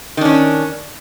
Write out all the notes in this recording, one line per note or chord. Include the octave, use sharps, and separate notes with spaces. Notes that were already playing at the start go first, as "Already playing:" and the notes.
D#3 C#4 D4